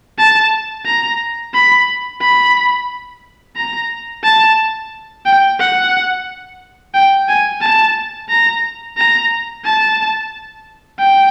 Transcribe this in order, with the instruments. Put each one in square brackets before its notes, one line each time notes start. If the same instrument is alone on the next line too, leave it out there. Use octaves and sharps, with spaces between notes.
[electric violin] A5
A#5
B5
B5
A#5
A5
G5
F#5
G5
G#5
A5
A#5
A#5
A5
G5